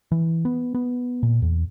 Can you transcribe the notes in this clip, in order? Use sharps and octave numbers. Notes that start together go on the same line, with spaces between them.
E3
B3
B3
A#2
E2